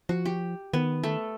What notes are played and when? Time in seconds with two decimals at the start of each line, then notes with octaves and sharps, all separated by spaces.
0.09 F3 F#4
0.26 G4
0.73 D#3 B3
1.03 A3 A4